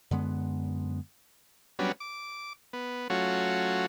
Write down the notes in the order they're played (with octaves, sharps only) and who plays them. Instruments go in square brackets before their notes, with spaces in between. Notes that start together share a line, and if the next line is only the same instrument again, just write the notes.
[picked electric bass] F#2 D3 G#3 B3
[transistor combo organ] F#3 G3 B3 C#4 D4
D6
B3
F#3 A3 C#4 F4 F#4